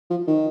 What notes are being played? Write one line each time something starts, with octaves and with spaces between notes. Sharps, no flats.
F3
D#3